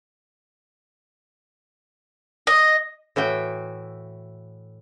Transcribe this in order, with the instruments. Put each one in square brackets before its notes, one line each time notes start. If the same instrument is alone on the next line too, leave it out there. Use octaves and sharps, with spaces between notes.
[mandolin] D#5
[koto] A2 E3 F#4 G5